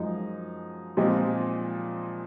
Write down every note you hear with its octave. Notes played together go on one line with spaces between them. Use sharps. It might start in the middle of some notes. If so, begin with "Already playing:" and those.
Already playing: F#2 F3 G#3 D#4 G#4
A#2 F3 G#3 C4 D#4